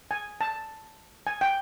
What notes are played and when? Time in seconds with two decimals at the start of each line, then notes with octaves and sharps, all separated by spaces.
0.11 G#5
0.41 A5
1.27 G#5
1.41 G5